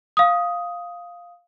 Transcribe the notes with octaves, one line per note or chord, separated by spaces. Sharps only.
F5 D#6